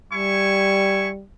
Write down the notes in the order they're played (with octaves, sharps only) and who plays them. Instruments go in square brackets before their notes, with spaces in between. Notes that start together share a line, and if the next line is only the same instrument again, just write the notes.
[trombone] G3 [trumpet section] E4 G#5 C#6